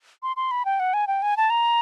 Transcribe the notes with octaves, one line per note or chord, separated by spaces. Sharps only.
C6
C6
B5
G5
F#5
G#5
G5
G#5
A5
A#5